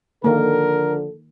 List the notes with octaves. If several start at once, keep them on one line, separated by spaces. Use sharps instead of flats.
D3 D#3 F3 A#3 A4 A#4